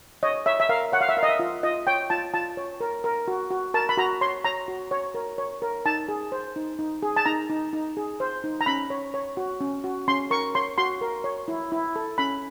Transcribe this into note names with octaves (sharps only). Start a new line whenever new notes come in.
C#5 D#5
C#5 E5
E5
A#4 F5
C#5 F#5
F5
E5
A#4 F5
D#5
E5
F4
F4 D#5
C#5 G5
F4 A5
F4 A5
C#5
A#4
A#4
F#4
F#4
A#4 A5
B5
F#4 A#5
C#5 C6
C#5 A#5
F#4
C#5
A#4
C#5
A#4
D#4 A5
G#4
C5
D#4
D#4
G#4
A5
D#4 A#5
D#4
D#4
G#4
C5
D#4
A#5
C#4 B5
C#5
C#5
F#4
C#4
F#4
C#4 C6
A#4 C#6
C#5 C6
F#4 C6
A#4
C#5
E4
E4
A4
C#4 B5